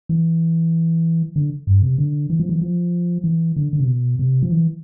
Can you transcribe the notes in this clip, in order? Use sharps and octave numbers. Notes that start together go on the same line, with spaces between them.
E3
D3
G2
C3
D3
E3
F3
E3
F3
E3
D3
D3
C3
B2
C3
F3
E3